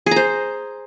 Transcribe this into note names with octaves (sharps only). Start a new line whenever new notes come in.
G#4 C5 A#5